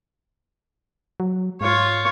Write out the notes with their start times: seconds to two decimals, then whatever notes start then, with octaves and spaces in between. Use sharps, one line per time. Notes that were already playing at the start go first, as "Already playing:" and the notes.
1.20 F#3
1.61 G#2 F4 C#5